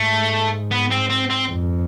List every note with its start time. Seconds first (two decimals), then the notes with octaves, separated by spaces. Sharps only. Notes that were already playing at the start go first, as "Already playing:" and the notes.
Already playing: G#2 A3
0.71 B3
0.90 C4
1.10 C4
1.30 C4
1.49 F2